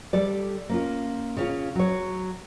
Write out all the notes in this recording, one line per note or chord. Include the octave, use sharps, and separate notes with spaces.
G3 A4 D5
A#3 C#4 F4
C#3 C#4 F4
F#3 C#5